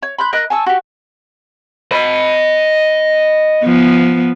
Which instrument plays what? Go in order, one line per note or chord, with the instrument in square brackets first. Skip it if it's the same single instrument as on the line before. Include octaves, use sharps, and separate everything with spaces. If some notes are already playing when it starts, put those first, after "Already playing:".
[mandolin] C#5
B5 C6 F#6 G6
A#4 D#5 B5 F#6
G#5 A5 C#6 E6
F#4 G4
[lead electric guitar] D#5 B5
[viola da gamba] F3 B3